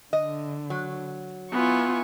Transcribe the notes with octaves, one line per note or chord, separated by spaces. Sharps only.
D3 D#5
F#3
B3 E4 F4 G#5 C#6